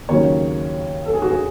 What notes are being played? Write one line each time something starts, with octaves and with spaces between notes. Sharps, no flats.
D#2 C#3 F#3 C#5
A4
G#4
F#4
G#4